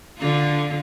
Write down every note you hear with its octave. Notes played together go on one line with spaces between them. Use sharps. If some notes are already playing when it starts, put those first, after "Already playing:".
D3 F4